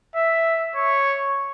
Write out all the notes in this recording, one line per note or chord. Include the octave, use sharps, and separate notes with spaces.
E5
C#5